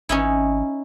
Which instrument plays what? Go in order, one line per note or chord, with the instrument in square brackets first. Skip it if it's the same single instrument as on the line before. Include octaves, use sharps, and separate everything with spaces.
[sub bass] G#1 [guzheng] C#4 D#4 E4